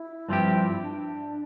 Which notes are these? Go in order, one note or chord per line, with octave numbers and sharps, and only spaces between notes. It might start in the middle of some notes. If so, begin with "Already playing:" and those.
Already playing: E4
G2 F3 C4 G4
D4